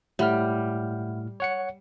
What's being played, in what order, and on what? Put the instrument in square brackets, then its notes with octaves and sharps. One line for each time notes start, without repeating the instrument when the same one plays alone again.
[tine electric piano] A2 F6 [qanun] G3 [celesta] E5 F#5 B5
[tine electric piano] C#5 F#5 C#7